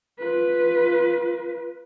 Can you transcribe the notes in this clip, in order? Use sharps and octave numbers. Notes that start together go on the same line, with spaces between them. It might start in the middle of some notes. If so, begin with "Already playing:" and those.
F4 B4